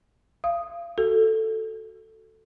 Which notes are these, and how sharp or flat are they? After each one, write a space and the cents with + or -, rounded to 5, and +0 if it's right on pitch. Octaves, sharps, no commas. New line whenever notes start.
F5 -30 D#6 +0
F#4 +5 A4 +5